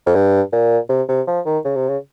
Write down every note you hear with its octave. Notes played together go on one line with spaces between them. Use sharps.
F2
G2
A#2
C3
C3
F3
D#3
C#3
C3
C#3